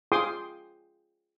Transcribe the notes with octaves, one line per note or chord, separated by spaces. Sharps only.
F4 G#4 G5 C6 D6 D#6